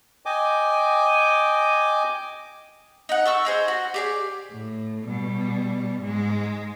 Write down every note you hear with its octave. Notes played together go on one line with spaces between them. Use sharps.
D#5 G5 G#5 D6
D#4 F#5
A4 C#6 E6
D#4 G#4 C5
F#4
G4 G#4 D5
A2
B2 G3
G#2 G#3